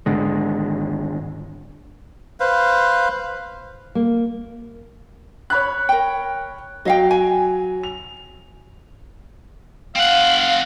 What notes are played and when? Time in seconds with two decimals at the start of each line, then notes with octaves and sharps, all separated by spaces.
0.06 G#1 D3 G#3
2.40 B4 C5 F5
3.95 A#3
5.50 C#5 B5 F#6
5.89 A#4 G5
6.85 F#3 D#5 F5 G5
7.11 G#5
7.83 F7
9.96 C4 F5 F#5